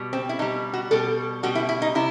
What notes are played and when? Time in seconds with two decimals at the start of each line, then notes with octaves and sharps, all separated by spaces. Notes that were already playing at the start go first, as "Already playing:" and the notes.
Already playing: B2 G3
0.13 C4
0.29 E4
0.39 B2 D#4
0.42 G3
0.74 F#4
0.91 B2 G3 A4
1.43 B2 G3 F#4
1.55 E4
1.69 E4
1.82 D#4
1.95 C3 E4